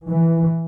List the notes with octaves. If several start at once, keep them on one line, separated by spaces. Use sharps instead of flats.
E3